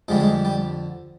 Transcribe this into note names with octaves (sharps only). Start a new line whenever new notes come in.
F2 D3 G3 G#3
G#3
G3